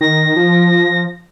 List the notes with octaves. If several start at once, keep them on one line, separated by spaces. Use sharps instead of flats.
D#3 A#6
F3